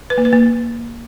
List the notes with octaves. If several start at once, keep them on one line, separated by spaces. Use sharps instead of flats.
B4
A#3
B4
A#3